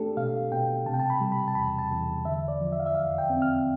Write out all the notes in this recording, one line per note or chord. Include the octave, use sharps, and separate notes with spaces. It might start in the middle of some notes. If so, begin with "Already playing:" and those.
Already playing: A3 D4 G4 A4
B2 F5
B2 G5
C3 A5
G5
A5
B5
G3
B5
A5
E2 B5
A5
E2
D3 E5
D5
F3
E5
F5
E5
F2 F5
G5
C4
F6